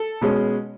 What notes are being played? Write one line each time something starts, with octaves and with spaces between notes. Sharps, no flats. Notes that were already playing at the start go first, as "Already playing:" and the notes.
Already playing: A4
B2 G#3 C#4